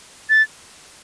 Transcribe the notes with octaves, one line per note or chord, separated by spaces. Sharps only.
A6